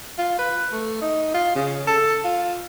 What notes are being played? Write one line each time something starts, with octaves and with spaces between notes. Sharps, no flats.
F4
B4
A3
D#4
F4
C#3
A4
F4